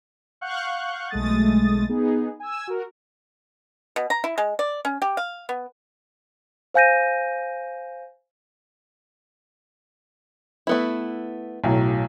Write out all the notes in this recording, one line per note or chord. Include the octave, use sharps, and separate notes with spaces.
F5 F#5 C#6 F#6 G6
B1 G#3 A3 D#6 A6
B3 D#4 G#4
G#5 E6
F#4 A#4
B2
A#5
E4
G#3
D5
C#4
G4
F5
B3
C5 F5 G#5 G6 A#6 D#7
A3 B3 E4
B1 A2 F#3